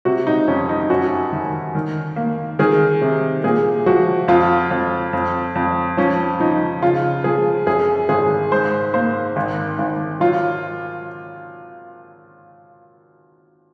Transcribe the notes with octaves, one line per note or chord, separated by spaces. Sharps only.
C3 F#4
D#4
F2 C#4
D#4
F#2 F#4
D#3
D#3
A#3
D#3 G#4
C3
A#2 G#4
F3 F#4
F2 F4
F2
F2
F2
F3 C#4
F3 D#4
C#3 F4
F3 G#4
F#2 G#4
G#1 G#4
G#2 C5
A#3 C5
G#1
G#1
F#3 F4